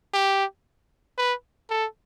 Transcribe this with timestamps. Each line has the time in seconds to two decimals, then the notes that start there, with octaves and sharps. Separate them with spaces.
0.14 G4
1.18 B4
1.70 A4